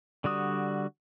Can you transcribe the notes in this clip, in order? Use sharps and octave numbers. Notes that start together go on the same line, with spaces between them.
D3 G3 F#4 D#6